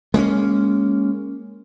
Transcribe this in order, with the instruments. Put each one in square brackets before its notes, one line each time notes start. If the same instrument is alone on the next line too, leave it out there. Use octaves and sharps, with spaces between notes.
[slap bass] G#3 A#3 B3 C#4